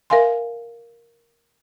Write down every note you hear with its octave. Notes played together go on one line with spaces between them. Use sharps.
A#4 E5 F5 G#5 C6